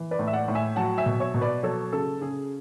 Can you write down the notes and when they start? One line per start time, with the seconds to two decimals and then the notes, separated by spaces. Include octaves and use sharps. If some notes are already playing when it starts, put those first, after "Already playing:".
Already playing: E3
0.11 B4 D5
0.19 A2
0.27 E5
0.33 D5 F#5
0.48 A2
0.55 E5 G#5
0.76 F#3 F#5 A5
0.98 E5 G#5
1.06 B2
1.20 C#5 E5
1.34 B2
1.41 B4 D5
1.63 F#3 A4 C#5
1.92 C#3 A4
2.21 C#3 G#4